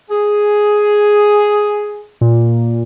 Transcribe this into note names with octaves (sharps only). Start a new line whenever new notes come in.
G#4
A#2